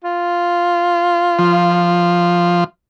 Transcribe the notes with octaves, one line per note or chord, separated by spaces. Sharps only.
F4
F3